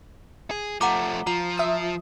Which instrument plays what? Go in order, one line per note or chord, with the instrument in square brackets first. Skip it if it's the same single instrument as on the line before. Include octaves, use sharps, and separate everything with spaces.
[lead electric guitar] G#4
[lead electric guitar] F3 A3 [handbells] F#5 A#5 D6
[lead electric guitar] F3 [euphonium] F4 [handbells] A#5
[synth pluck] E5 D#6